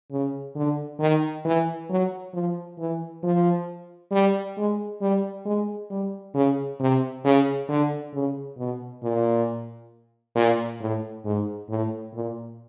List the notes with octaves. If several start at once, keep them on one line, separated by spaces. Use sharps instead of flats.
C#3
D3
D#3
E3
F#3
F3
E3
F3
G3
G#3
G3
G#3
G3
C#3
C3
C#3
D3
C#3
B2
A#2
A#2
A2
G#2
A2
A#2